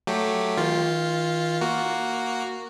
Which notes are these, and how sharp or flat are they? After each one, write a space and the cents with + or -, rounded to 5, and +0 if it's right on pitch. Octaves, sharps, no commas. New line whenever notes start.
F#3 +0 A3 +0 G4 +0
D#3 +45 F4 +0
A#3 +0 F#4 +0